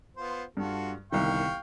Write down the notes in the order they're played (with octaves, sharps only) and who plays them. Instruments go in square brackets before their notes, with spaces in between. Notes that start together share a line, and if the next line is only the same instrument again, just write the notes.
[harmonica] B3 F4 C5
[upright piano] G2 [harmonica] F4 F#4 A4
[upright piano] G1 C2 D#3 [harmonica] F5 G5 C#6